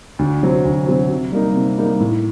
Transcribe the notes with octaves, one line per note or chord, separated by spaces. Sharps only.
D2
C3 F#3 C4
D2
C3 F#3 C4
C3
G3 A#3 D#4
C3
G3 A#3 D#4
A2